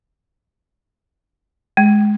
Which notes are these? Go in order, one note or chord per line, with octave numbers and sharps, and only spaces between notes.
G#3